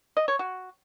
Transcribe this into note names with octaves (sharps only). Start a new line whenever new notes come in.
D#5
C#5
F#4